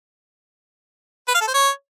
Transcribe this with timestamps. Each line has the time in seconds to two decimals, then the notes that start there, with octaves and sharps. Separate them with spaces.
1.28 B4
1.35 F5
1.41 A4
1.47 C5
1.54 C#5